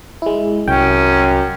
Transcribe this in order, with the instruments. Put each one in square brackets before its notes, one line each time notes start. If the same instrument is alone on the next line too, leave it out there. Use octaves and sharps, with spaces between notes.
[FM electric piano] G#3 E4
[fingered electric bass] C2 [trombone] F#2 [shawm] C#4 [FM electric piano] G5